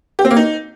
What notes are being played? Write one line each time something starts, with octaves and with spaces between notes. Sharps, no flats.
G4
C4
A#3
D#4